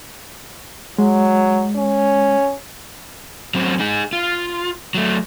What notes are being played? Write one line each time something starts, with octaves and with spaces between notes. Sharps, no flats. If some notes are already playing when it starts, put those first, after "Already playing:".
F#3 G#3
C#4
F#3 C4 C#4
D#4 G#4
F4
F#3 A3